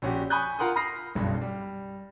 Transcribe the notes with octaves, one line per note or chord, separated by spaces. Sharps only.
A#1 C#4 F#4 G4
G#5 B5 C#6 D#6 F#6 G6
F4 A#4 F#5 C6 D#6
B5 D#6 F6 A#6 C7
F#1 B1 G2
G3